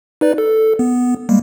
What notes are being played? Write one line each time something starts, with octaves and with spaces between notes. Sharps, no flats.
D#4 B4 D5
A4
B3
G3 G#3 A#3